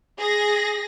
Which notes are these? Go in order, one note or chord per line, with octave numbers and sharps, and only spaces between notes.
G#4 A#6